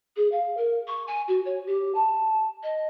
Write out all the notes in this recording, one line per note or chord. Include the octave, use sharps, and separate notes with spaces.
G#4
F5
A#4
C#6
G#5
F#4
C#5
G4
A5
D#5